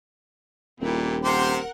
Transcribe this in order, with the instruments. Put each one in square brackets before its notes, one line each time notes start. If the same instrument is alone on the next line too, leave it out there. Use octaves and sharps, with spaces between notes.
[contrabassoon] D#1 [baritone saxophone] A#2 [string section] C4 E4 G4
[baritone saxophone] C3 [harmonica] G4 C5 C6 [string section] A#4 F#5